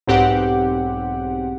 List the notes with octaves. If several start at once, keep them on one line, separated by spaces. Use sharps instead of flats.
B1 G#2 C4 G4 F#5